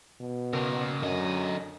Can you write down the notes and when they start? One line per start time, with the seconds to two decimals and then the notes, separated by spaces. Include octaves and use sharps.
0.20 B2
0.53 C#3 A#4
1.03 F#2 D3 D#5